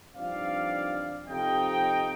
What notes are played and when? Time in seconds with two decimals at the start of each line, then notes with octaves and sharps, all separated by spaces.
0.16 G2 F3 C4 D#4 D5 F5
1.28 F2 C3 F3 C4 D#4 D#5 G5